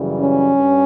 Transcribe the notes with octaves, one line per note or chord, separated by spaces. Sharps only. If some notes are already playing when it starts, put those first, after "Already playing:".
Already playing: F#2 C#3 E3 G3
C#4
G2